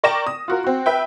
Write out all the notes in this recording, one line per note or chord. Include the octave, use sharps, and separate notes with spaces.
A#4 D5 G5 C#6 A#6 E7
D#6
F4 F#4 A#4
C4 F#4
B4 E5 G5